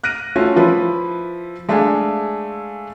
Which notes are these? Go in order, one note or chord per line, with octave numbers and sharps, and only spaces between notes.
F6 F#6 A#6 D7 D#7
A3 C#4 F4 F#4
F3 E4 B4
G#3 A3 D4 E5 F5 G#5